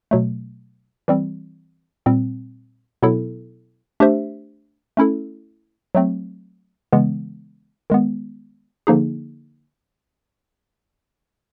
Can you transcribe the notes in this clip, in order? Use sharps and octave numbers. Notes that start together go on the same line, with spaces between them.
B2 F#3 A3
E3 G3 C4
A#2 G3 C4
B2 F#3 B3 E4 A4
A3 D4 G4 C5 E5
A3 C#4 E4 A4
F#3 A3 C4
C#3 E3 G#3 B3
D#3 G#3 B3
D3 F3 A#3 D#4 G#4